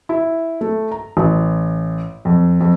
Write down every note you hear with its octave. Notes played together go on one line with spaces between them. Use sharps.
E4
A3
A#5
A1
F2
F2